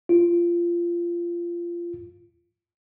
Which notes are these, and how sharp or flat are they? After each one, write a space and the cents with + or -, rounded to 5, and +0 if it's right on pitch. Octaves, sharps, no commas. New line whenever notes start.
F4 -20